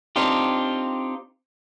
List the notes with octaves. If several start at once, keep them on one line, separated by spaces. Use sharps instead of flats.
C4 D4 D#4 F4 G4